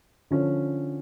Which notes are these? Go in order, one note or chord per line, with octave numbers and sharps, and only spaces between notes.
D3 F3 C#4